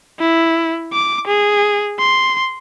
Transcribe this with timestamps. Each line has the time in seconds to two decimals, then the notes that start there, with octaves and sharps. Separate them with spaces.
0.20 E4
0.93 D6
1.27 G#4
1.99 C6